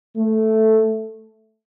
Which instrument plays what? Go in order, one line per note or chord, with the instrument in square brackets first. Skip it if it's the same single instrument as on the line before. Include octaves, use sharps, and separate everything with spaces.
[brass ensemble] A3